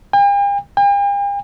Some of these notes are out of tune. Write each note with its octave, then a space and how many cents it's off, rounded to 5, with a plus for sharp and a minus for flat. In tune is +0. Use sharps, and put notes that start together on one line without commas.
G5 +45
G5 +45